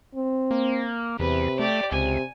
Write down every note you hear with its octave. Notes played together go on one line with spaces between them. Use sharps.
C4
A#3
E2 C3 B4
A3 G4 D5
C#2 C3 G#5